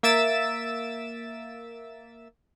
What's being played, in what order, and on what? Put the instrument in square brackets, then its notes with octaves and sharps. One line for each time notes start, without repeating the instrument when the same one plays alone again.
[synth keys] A#3 E5 E6 A6 D7 E7